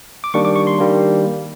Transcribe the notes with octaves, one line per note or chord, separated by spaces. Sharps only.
D6
D#3 G3 A#3 D4 C#6
D6
C#6
C6
D#3 G3 A#3 D4